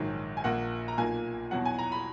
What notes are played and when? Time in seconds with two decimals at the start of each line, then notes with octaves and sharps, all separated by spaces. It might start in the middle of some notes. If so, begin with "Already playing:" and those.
Already playing: A#1 G#2 D#3 F#3 G#5
0.37 G#5
0.44 A#1 A#2 A#3 F#5
0.88 A#5
0.98 B1 A#2 A#3 G#5
1.51 E2 B2 F#3 F#5
1.65 G#5
1.79 A#5
1.92 B5